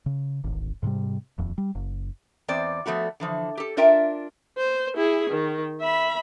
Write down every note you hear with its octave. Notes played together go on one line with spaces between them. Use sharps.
C#3
D1 G#1
G#2 C3 E3 G3
D#1 F2
G3
F#1
E2 C4 C5 D5
F3 A3 B3 F#4
D3 E3 F3
G4 A4
D4 F4 A#4 E5 G5
C5
E4 G#4
D#3
E5 B5